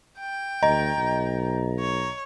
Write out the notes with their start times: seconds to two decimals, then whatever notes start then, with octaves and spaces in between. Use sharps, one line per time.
0.18 G5
0.63 D2 D#5 A#5
0.98 B1
1.79 C#5